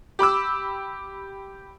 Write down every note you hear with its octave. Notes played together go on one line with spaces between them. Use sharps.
G4 B5 D6 E6